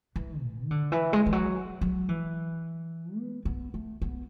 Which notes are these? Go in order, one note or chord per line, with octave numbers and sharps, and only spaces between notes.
E3
A2
E3
D3
E3
G#3
E3
F#3
F#3
E3
B3
B3
A3
B3